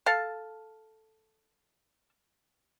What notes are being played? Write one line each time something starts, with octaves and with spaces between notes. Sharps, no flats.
A4 F5 A5